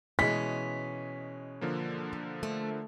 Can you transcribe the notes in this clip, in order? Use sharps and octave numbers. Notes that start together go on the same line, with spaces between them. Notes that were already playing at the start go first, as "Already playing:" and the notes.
B2 E3 G#3 C#4 B6
D3 F3 A#3
A3